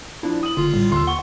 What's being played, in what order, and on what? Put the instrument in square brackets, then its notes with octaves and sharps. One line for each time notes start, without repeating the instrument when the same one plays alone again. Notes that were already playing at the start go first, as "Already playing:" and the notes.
[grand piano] F3 D4 [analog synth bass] E4
[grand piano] D#6 F#7
[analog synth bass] F#1 [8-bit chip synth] D3 [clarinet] F4
[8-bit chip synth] A1 A2 G3
[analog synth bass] D#2 [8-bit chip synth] D3 [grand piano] C6 E6
[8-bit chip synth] F#5 C#6 [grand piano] G7